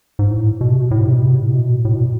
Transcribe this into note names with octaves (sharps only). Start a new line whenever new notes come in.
G#2
A2
B2
C3
B2
A2
G#2
C3
B2
C3
A2
B2
A2
B2